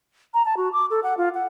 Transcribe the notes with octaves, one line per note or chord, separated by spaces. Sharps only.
A#5
A5
F#4
D6
A4
F#5
F4
F#5